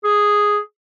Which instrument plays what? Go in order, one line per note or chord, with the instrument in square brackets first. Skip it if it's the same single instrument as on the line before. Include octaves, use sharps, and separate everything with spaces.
[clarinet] G#4